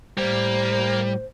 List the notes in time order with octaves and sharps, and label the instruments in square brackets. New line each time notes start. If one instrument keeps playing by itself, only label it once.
[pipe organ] A2 [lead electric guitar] G3 [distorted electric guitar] A#3 A#4 [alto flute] C5